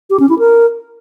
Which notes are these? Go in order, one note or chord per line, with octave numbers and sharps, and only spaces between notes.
G4
C#4
E4
A#4